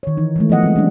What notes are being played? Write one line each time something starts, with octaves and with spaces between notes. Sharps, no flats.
D#3 C#5
E3 D#4
E3 G#3 A3
F3 B3 D#5 F#5
G#3 C4
G3 C#4 D4